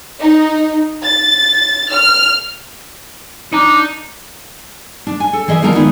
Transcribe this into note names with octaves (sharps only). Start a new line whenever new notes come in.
D#4
A6
F6
D4 D#4 A#5
D4
G#5
A4
E3 G#4 D#5 E5
D3 F3 G#3 B3 F4 A#4
D#3 G#3 B3 D#4 E4 B4